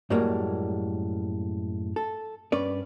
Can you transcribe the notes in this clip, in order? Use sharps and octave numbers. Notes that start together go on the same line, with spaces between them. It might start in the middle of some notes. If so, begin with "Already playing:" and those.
F#2 A2 G3 G#3 A#3
A4
G2 C#4 B4 D5